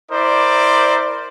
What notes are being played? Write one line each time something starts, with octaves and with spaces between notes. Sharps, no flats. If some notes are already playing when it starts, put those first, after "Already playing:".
E4 A#4 C5 D5